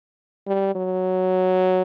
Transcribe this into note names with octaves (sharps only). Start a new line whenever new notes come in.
G3
F#3